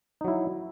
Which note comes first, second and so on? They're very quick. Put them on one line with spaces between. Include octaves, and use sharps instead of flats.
D#4 F#3 E4